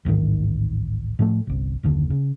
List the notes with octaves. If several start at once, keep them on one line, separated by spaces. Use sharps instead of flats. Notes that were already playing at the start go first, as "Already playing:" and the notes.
D1 A1 G#2 D#3
A2 F3 G#3 A3
G1 C2
F#1 D#2 D3
C#3